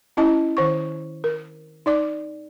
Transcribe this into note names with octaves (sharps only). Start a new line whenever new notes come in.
C#4 E4 D#5 A5
D#3 C5 C#6
A#4
D#4 D5 D6